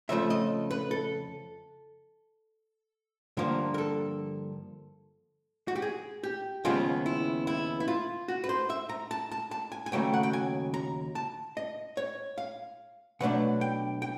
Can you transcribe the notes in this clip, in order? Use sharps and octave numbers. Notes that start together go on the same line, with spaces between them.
F2 C#3 F3 A3 E5
D#5
B4
A4
G2 D3 F3 A#3 A#4
A#4
A4
F#4
G4
G#4
G4
D#2 C#3 F3 G#3 B3 F4
E4
E4
E4
F4
F#4
B4
C5
E5
A#5
A5
A5
A5
G#5
G#5
D#2 C#3 F#3 A3 G5
F#5
G5
G#5
A#5
A5
D#5
C#5
F5
B2 F#3 A3 D4 F#5
G5
G5